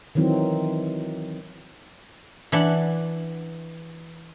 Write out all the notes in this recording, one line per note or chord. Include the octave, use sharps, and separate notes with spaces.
D#3 E3 F#3 C4
E3 D4 F#5